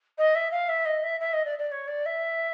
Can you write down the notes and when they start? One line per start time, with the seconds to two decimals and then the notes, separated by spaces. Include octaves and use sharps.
0.18 D#5
0.35 E5
0.51 F5
0.69 E5
0.85 D#5
1.03 E5
1.20 E5
1.33 D#5
1.45 D5
1.59 D5
1.71 C#5
1.88 D5
2.06 E5